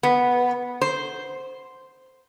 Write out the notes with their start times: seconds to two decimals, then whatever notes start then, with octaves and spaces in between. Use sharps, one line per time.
0.03 B3
0.81 C5